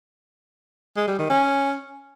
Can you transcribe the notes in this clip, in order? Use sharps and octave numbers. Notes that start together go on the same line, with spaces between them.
G#3
G3
D#3
C#4